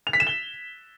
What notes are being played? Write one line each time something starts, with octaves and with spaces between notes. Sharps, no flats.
F7
B6
E7
G7